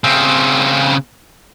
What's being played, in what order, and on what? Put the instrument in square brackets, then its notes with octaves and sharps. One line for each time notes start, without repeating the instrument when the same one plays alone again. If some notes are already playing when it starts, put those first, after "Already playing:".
[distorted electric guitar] C#3 C4